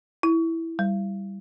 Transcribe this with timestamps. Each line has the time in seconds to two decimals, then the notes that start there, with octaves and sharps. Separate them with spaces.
0.23 E4
0.79 G3